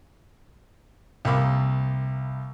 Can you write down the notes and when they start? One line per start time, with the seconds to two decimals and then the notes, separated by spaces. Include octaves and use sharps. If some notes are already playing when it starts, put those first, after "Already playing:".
1.25 C2 A#3 F4 B5 D6